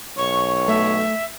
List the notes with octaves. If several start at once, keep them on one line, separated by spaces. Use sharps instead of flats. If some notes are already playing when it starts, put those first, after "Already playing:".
B1 C#5 C#6
A3 E5